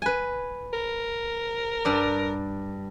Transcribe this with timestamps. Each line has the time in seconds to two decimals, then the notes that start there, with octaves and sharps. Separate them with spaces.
0.02 B4 G#5
0.73 A#4
1.85 G2 D5